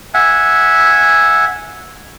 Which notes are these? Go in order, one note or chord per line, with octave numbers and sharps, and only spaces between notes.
E5 F#5 G#5